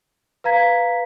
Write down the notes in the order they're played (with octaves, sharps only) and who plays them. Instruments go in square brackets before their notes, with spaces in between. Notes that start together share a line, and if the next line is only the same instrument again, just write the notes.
[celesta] B4 F5 A#5 G#6 B6